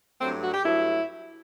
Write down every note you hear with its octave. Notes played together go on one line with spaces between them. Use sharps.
G2 F#3 A3 C4
F#4
G4
G2 F#3 A3 E4